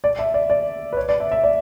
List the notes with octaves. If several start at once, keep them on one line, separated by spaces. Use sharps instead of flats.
D5
E5
D5
D5
B4
C#5
D5
E5
E5
D5